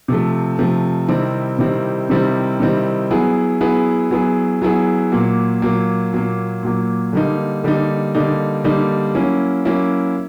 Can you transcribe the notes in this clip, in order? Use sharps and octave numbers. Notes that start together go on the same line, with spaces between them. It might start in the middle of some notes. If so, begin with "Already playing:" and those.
C3 F3 A3
C3 F3 A3
C3 D#3 G3 C4 E4
C3 D#3 G3 C4 E4
C3 D#3 G3 C4 E4
C3 D#3 G3 C4 E4
F#3 B3 E4 G#4
F#3 B3 E4 G#4
F#3 B3 E4 G#4
F#3 B3 E4 G#4
A#2 F#3 A#3
A#2 F#3 A#3
A#2 F#3 A#3
A#2 F#3 A#3
D3 G3 A#3 D#4
D3 G3 A#3 D#4
D3 G3 A#3 D#4
D3 G3 A#3 D#4
F#3 A#3 C#4 E4
F#3 A#3 C#4 E4